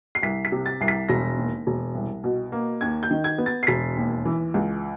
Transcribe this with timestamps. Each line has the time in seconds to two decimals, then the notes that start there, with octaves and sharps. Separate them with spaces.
0.15 C7
0.23 C2 B6
0.45 B6
0.52 C3
0.66 A6
0.81 C2 C7
0.88 B6
1.09 E1 A#6
1.37 D#2
1.67 E1
1.95 C2
2.24 B2
2.52 A#3
2.81 D#2 G#6
3.03 G6
3.11 D#3
3.24 G#6
3.38 B3
3.46 A6
3.63 C7
3.67 E1 B6
3.97 D#2
4.25 E3
4.54 C#2